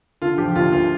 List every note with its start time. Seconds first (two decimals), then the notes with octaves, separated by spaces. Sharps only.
0.22 D3 F4
0.38 F3 G4
0.55 D2 F4
0.72 D2 F4